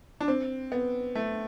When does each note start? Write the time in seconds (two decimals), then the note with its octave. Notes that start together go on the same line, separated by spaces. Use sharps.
0.21 D4
0.28 C4
0.72 B3
1.15 A3